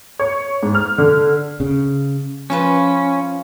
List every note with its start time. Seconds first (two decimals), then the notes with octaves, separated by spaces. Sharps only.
0.19 C#5
0.63 G#2
0.75 F6
0.98 D3
1.60 C#3
2.50 F3 C#4 F4 B4